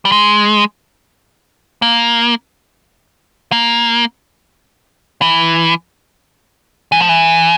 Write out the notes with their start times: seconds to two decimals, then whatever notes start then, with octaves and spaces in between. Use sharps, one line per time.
0.05 G3
0.12 G#3
1.82 A#3
3.52 A#3
5.22 E3
6.92 E3
7.00 F3
7.09 E3